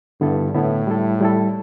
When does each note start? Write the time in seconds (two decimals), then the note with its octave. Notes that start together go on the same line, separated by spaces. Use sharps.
0.20 G2 D3 B3 E4 A4
0.54 A2 D3 B3 E4 A4
0.87 G3 E4 A4
1.21 G3 E4 A4